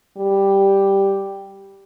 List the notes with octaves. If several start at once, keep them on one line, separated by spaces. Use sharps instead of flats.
G3